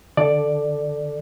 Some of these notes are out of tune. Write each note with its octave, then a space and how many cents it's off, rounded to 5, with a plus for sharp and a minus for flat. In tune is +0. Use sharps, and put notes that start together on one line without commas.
D3 +0 A4 +0 D5 +5